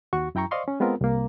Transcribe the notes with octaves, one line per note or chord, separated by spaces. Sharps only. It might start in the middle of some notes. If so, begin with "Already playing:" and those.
D#2 F#4 C#6
F#2 E4 G5 A#5 C#6
C5 D5 D#5 F5 C6 C#6
C#4
G#3 B3 C4 F4 A#4
C2 A#3